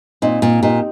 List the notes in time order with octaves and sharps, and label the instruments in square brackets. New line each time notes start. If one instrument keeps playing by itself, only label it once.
[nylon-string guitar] A#2 [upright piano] C4 D#4
[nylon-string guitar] A#2
[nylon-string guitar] A#2 [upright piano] D#4 G4